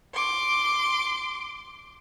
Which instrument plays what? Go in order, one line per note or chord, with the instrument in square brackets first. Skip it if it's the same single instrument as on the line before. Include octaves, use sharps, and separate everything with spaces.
[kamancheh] C6 D6